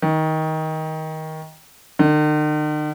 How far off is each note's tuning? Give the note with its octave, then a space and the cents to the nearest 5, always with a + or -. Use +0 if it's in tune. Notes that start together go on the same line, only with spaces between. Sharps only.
D#3 +20
D#3 -45